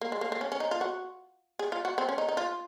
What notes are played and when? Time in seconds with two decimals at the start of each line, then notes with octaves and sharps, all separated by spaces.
0.01 A#3
0.12 G#3
0.21 A#3
0.32 A#3
0.41 C#4
0.52 C#4
0.60 D#4
0.71 F4
0.81 F#4
1.59 G#4
1.72 F4
1.85 F#4
1.98 C4
2.09 C#4
2.18 D#4
2.29 D#4
2.37 F4